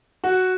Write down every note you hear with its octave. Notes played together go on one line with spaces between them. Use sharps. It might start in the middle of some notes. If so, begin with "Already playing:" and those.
F#4